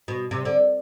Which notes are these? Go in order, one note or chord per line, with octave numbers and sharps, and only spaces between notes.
B2
C3
D3